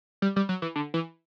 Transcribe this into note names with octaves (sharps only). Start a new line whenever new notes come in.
G3
G3
F#3
E3
D3
E3